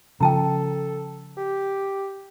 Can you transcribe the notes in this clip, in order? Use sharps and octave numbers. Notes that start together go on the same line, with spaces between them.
C#3 F3 A4 G5 A5 A#5
G4